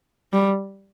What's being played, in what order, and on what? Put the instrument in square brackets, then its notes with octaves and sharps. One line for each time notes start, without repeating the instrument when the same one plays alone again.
[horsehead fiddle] G3